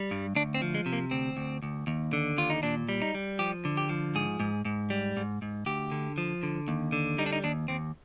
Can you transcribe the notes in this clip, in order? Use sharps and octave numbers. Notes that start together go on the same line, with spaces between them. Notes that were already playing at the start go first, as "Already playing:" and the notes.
Already playing: G3
G2
D2 D4
C4
F3
G#3
C3
A#3
D2 C4
D2
D2
D#2
D3
D#2 F4
D#4
A#2 D4
G3
D#4
G3
F3 G4
D3
G4
F3
G#2 G#4
G#2
G#2
G3
G#2
G#2
D2 G4
D3
F3
D3
D#2
D3
G3 D#4
D4
D#4
D#2 D4
D#2 C4